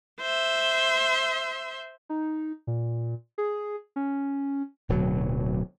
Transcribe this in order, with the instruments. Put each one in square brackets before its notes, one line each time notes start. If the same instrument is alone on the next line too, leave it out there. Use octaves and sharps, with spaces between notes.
[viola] C5 E5
[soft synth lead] D#4
A#2
G#4
C#4
[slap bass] D1 B2 F#3